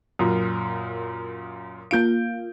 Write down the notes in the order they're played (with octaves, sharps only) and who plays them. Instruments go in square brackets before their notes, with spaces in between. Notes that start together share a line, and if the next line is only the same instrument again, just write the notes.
[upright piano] F#2 A#2 [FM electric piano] C6 D#6
[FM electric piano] A#3 F4 F5 [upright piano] G6 D7